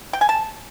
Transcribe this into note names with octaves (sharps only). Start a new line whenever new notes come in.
G5
G#5
A5